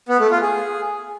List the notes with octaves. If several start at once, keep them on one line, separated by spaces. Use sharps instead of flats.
B3
A3
F4
G#4